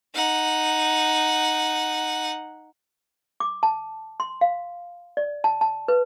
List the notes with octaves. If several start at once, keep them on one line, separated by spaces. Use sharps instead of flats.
D#4 F#5
D6
A5
C6
F5
D5
A5
A5
B4